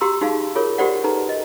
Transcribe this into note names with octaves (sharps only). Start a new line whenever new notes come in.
F#4 G4 A#5 C6 E6
D#4 F#4 G#4 F5 A5
F4 G#4 A#4 C#5
F#4 G4 A#4 C5 D5 F#5
D#4 A4 B4 A#5
D#5